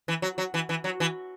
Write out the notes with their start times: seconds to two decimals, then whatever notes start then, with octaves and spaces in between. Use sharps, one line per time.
0.08 E3
0.22 F#3
0.38 F#3
0.54 E3
0.69 E3
0.84 F#3
1.00 E3